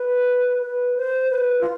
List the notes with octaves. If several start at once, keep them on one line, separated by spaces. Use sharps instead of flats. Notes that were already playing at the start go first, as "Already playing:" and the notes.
Already playing: B4
B4
C5
B4
F4